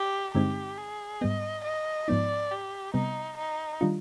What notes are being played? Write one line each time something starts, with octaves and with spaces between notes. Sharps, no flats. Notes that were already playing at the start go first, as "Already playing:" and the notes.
Already playing: G4
G2 D3 G#3 C4 D#4 G4
G#4
G#2 G3 B3 D#5
D#5
G#2 F3 B3 D#4 D5
G4
C3 G3 B3 D#4
D#4
D#3 G3 D4 F4